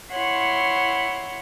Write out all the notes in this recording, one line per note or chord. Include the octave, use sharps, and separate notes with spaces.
E4 C#5 F#5 C6